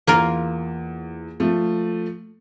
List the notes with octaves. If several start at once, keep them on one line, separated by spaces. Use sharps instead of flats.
E2 A#3 F4 A#4
F3 A3